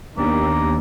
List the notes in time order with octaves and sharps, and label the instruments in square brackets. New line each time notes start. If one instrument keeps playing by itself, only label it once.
[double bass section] D#2 [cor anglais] A#3 [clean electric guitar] B3 D4 G4